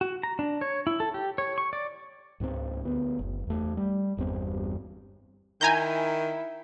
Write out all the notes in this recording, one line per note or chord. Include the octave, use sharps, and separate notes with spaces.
F#4
A#5
D4
C#5
E4
A4
G4
C#5
C#6
D5
C#2 G#2 G3 C4
D2 B3
F#1
E2 A3
G3
G1 E2 G2 C4
D#3 E4 G#5 A#5 G6